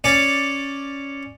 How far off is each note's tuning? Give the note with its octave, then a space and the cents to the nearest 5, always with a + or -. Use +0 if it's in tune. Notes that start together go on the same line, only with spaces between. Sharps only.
C#4 +0 D5 +0